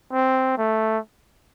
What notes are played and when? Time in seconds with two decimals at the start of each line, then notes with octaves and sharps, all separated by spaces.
0.13 C4
0.58 A3